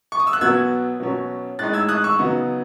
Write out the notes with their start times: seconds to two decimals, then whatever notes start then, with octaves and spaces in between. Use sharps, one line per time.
0.12 C#6
0.20 D#6
0.27 E6
0.33 F#6
0.41 B2 F#3 B3 E6 G#6
1.00 B2 F#3 C#4
1.59 A2 G#3 D#4 F#6 A6
1.73 E6 G#6
1.89 D#6 F#6
2.04 C#6 E6
2.18 C#3 F#3 B3 D#4